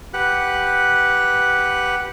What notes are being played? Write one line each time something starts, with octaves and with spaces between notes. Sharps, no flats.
G4 B4 F#5 F#6